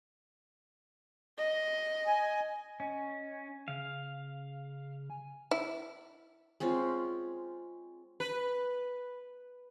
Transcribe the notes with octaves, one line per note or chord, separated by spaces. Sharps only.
D#5
G#5
C#4 D#5
C#3 F5
G#5
E4
G#3 C4 C#4 F4
B4